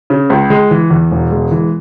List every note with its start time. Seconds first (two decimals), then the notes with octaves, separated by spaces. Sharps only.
0.10 C#3
0.30 C#2
0.50 G#3
0.71 E3
0.90 E2
1.11 E1
1.32 G#3
1.51 E3